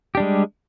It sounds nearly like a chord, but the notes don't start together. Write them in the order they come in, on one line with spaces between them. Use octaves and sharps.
G4 D4 G3 G#3